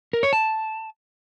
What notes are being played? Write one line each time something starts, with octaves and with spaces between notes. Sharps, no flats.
A#4
C#5
A5